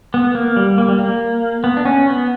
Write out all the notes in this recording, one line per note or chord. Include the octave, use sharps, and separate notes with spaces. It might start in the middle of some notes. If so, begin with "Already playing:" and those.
B3
A#3
G3
A#3
G3
A#3
B3
D4
C#4
B3